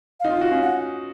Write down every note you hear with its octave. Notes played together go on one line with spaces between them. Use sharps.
D#4 F5
F4
F#4
C#4
F#5